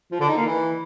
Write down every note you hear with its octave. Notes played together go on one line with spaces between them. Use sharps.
F3
D3
D#4
A#3
E3